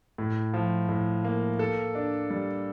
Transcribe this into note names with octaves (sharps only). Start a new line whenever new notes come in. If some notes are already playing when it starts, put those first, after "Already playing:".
A2
F3
A2
A#3
A4
D4
G3